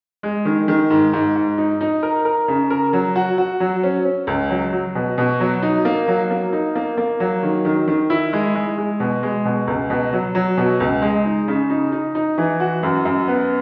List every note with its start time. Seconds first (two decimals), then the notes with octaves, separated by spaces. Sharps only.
0.23 G#3
0.45 D#3
0.68 D#3
0.90 G#2
1.13 G#2
1.35 G#2
1.58 D#4
1.81 D#4
2.03 A#4
2.25 A#4
2.48 C#3
2.70 A#4
2.93 F#3
3.16 F#4
3.38 F#4
3.60 F#3
3.83 C#4
4.05 C#4
4.27 C#2
4.50 F#3
4.73 F#3
4.95 B2
5.18 B2
5.40 F#3
5.63 D#4
5.85 A#3
6.08 F#3
6.31 A#3
6.53 D#4
6.75 A#3
6.98 A#3
7.20 F#3
7.43 D#3
7.65 D#3
7.88 D#3
8.10 E4
8.33 G#3
8.55 G#3
8.78 G#3
9.00 B2
9.23 G#3
9.45 B2
9.67 C#2
9.90 B2
10.13 F#3
10.35 F#3
10.57 B2
10.80 C#2
11.02 G#3
11.25 D#4
11.48 C#3
11.70 D#4
11.92 D#4
12.15 D#4
12.38 E3
12.60 F#4
12.83 F#2
13.05 F#2
13.28 B3